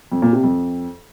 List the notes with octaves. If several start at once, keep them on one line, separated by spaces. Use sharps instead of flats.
F2
A#2
C3
F2